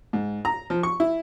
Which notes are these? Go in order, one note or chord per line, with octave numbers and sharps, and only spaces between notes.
G#2
A#5
F3
C#6
E4